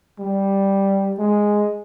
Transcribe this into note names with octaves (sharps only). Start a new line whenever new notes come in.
G3
G#3